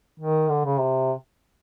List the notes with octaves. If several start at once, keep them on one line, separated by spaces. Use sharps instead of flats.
D#3
D3
C#3
C3